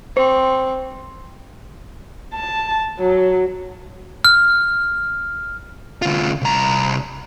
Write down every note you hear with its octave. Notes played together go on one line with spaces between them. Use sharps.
C4 C5
A5
F#3
F6
D2 F4
C2 A#5